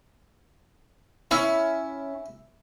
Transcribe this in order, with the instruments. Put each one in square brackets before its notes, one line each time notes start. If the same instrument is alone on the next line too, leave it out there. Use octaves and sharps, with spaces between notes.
[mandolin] C#4 [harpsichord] E4